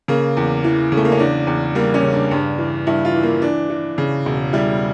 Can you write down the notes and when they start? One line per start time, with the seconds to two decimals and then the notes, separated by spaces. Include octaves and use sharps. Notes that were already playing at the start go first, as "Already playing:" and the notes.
0.08 C#3 A#3
0.37 E2
0.64 E3
0.92 C#3
0.97 A3
1.05 A#3
1.12 C#4
1.19 E2 D4
1.47 E2
1.75 G3 A#3
1.94 C#4
2.03 C#3
2.13 D4
2.31 G2
2.58 E3
2.87 G2 E4
3.05 F4
3.15 E3
3.23 A#3
3.42 E3 D4
3.70 E3
3.98 C#3
4.26 E1
4.53 G3 E4